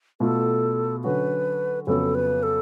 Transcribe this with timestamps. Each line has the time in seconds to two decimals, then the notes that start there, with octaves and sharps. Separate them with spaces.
0.20 B2 A3 F4 A4
1.04 D3 F#3 C#4 F#4 B4
1.87 F2 C#3 F#3 B3 A4
2.15 B4
2.43 A4